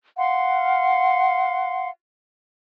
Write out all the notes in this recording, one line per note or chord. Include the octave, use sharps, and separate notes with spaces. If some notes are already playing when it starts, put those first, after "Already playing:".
F5 F#5 C6